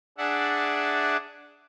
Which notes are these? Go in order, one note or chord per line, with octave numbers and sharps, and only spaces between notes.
D4 G#4 D5 E5 F#5